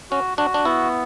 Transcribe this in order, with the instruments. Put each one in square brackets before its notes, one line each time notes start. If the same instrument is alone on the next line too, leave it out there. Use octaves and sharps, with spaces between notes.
[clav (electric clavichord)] C#4 [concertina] F#4
[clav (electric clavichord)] D4 [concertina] F#4
[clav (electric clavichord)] D4
[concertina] B3 [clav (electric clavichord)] E4